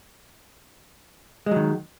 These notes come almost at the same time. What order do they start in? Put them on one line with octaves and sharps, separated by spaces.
G#3 F#3 D#3